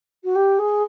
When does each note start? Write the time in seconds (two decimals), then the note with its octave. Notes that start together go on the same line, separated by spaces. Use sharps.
0.24 F#4
0.35 G4
0.58 G#4